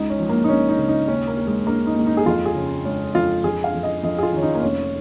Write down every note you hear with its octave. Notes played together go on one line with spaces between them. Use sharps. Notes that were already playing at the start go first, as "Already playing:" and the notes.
Already playing: C#2 D#4
C#4
F3
A#3
D#4
C#2 C#4
D#4
C#3
D#4
D#2 C#4
A#3
D#2
G#3
G#3 A#3
D#4
D#2
D#4
G#4
F2 F4
G#4
C#3
G#3 C#5
F2 F4
F2 G#4
F5
F2
D#5
F2 D#5
G#4
F4
D#3 C#4
D#4
A#3
F1 C#4